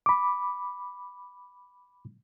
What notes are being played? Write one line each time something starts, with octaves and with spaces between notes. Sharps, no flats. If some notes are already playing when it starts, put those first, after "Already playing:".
B5 D6